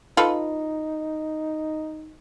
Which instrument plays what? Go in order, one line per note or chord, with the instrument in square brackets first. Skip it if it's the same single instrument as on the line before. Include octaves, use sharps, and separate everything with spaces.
[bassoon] D#4 [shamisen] F4 A4 B4